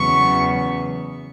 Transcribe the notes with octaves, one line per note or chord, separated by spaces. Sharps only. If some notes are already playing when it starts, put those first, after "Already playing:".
Already playing: E2 C#3 F#3 B3 C#6